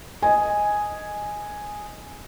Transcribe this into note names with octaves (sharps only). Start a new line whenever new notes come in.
D#5 G#5